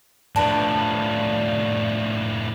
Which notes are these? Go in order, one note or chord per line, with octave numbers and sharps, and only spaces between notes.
A2 F3 D4 B4